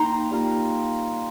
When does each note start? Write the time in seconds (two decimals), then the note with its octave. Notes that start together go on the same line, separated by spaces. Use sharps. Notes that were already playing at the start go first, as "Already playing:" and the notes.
Already playing: A#3 D#4 G5 A#5 C6
0.31 G3 A#3 F4